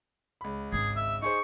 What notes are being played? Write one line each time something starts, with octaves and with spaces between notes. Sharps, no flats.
C#2 B5
G#1 D4 G#4
E5
D#4 G#4 C5 C#6